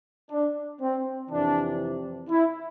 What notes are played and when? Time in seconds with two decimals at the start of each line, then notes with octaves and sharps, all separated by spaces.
0.30 D4
0.81 C4
1.30 F2 C3 E3 D4
2.29 E4